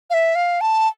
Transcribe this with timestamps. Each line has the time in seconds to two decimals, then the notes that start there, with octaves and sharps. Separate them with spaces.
0.10 F5
0.14 E5
0.35 F5
0.61 A5